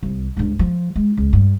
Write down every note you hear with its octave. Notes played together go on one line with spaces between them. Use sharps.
C2
C#2 G2
F3
G#3
C#2
G2